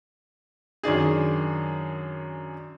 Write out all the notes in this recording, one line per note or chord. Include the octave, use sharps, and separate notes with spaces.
F#2 D#3 D4 G#4